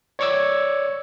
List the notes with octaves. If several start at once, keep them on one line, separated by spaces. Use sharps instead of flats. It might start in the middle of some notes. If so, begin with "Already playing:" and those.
C#5 D5 C#6 D6 E6 G#6